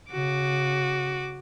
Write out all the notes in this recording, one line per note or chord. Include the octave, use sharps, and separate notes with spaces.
C#3 F#4 D6